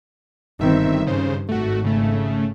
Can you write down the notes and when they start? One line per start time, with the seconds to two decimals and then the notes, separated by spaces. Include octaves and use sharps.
0.59 G1 G2 D#3 C4 E5
1.07 G2 C#3 C5
1.49 G#1 A3 F#4
1.84 C#3 A3